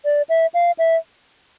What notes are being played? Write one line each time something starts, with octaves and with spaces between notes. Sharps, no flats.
D5
E5
F5
E5